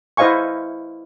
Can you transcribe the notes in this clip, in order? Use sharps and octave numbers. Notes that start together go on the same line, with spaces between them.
E4 C5 D#5 F5 G#5 C#6